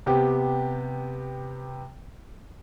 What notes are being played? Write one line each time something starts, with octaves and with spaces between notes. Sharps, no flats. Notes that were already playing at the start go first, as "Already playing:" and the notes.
C3 B3 G4